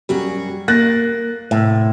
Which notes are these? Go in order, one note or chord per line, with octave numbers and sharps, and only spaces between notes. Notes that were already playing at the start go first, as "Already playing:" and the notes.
F#2 G3 F#4 G#4
A#3 F#6 A6 A#6
A2 C3